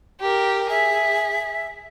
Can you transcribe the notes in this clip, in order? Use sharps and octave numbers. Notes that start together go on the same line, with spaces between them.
G4 A#4
G#4 E5